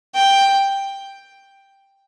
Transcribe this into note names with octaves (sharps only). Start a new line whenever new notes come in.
G5